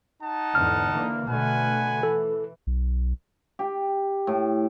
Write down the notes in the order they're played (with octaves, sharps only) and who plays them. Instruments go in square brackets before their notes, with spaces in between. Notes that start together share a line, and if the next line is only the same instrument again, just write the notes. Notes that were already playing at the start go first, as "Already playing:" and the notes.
[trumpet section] D#4 F#5 A5
[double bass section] E2 G#2 D3 [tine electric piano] F6
[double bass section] D3 E3 A#3
[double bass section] B2 D3 A3 [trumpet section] B4 F#5 G#5
[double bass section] E3 [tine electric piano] A4
[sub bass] B1
[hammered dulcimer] G4
A2